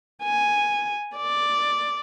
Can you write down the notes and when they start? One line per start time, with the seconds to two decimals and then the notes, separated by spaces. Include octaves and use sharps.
0.23 G#5
1.16 D5